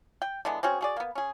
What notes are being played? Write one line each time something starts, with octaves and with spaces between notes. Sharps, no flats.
G5
D3 E3 G#3 B3
C4 C#4 F#4 G#4
F#4 G#4 D5
A#3 B3
C#4 G#4